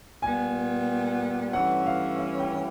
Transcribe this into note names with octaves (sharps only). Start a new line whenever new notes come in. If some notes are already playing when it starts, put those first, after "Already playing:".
A#2 G3 B3 G#5
G2 E3 A3 C#4 F#5
F5
F5
G5